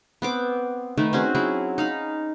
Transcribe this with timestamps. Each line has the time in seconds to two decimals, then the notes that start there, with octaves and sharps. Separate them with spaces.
0.22 B3 C4 D6
0.98 D#3 A3 B4
1.13 C4 C#4 F#4 G#4
1.35 F#3 E4 G#4
1.78 D#4 F5 B5